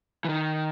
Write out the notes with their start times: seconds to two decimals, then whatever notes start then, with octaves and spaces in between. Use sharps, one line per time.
0.25 E3
0.29 D#3